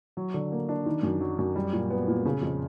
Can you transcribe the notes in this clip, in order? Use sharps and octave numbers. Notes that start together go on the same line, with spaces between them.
F#3
D3
A#3
D4
D#3
F#2
F#3
F#2
G3
A#2
B3
A#2
C#3
F2